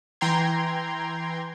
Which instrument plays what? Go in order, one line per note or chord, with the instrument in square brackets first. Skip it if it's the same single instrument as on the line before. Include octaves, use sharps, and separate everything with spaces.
[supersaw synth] E3 G5 A#5 C6 G#6